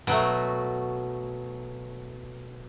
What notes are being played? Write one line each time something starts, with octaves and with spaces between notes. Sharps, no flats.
B2 F#3 A3